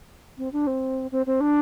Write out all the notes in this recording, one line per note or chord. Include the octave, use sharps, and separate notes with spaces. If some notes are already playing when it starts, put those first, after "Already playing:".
C4
D4
C4
C4
C4
D4